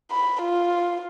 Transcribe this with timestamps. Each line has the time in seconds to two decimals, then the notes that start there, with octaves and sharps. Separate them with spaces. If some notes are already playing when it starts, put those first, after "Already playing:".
0.11 B5
0.41 F4